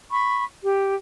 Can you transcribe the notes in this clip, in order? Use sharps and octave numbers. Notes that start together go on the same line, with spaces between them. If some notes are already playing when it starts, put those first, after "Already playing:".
B5 C#6
G4